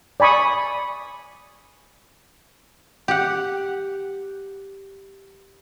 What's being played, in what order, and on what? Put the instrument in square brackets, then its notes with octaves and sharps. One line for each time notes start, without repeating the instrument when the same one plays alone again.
[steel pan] D5 G#5 B5 C#6 D#6
[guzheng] G4 F#5